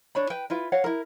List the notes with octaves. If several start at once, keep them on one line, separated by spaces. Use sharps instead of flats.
D4 C#5 B5
B4 G5
E4 F4 B4
C#5 F5 F#5
E4 A#4